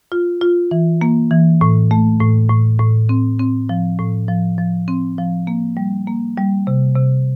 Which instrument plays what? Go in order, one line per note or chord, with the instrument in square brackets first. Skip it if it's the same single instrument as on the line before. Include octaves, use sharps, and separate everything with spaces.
[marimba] F4
F4
E3
A#3
E3
A2
A3
A2
A2
A2
C4
C4
F3
A2
F3
F3
C4
F3
A#3
G3
A#3
G3
C3
C3